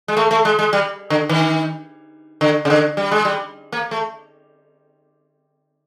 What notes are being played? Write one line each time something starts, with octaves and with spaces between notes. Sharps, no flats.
G#3
A3
A3
G#3
G#3
G3
D3
D#3
D3
C#3
D3
G3
G#3
G3
A#3
A3